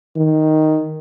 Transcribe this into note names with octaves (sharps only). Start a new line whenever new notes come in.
D#3